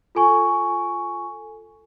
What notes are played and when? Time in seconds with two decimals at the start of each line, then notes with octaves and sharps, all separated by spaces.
0.15 F4 A4 G#5 C#6